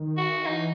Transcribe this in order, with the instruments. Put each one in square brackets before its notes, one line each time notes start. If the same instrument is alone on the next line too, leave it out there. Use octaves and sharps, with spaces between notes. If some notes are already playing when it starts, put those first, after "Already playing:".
Already playing: [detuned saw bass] D#3
[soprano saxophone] F#4
[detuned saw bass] E3 [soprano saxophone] D#4